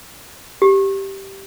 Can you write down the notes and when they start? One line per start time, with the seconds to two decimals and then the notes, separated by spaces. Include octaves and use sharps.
0.62 G4